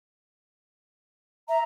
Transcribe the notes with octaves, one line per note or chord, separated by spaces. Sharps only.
E5 A#5